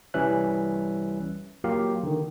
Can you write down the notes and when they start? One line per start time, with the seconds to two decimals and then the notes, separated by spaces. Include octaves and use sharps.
0.14 C2 E3 G3 C#4 E5 F#6
1.64 F#3 A#3 F4 G4 A#4 F5
2.03 D3 D#3